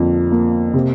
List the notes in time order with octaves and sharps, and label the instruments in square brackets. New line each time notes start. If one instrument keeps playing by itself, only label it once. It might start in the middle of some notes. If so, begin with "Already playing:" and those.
Already playing: [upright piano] F2 D3 A#3
A#3
C3